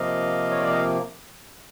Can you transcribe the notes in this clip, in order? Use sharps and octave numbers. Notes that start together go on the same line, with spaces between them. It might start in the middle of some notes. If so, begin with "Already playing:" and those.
Already playing: C3 F3 A#3 D#5 F5
C#5
D5
D#5